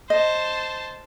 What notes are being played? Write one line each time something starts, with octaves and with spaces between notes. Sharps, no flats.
C5 D#5 A5